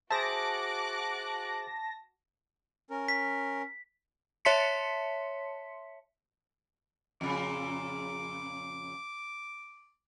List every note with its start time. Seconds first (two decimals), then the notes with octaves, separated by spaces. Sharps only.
0.10 F#4 G#4 C5 E5 A5 D6 F#6 A#6
2.90 C#4 A#4
3.08 B6
4.45 C#5 E5 A5 C6 B6 C#7
7.21 F2 A#2 C#3 D6